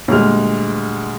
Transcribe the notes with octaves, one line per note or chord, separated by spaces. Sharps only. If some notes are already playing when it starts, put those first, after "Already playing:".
D2 A#2 G3 G#3 F6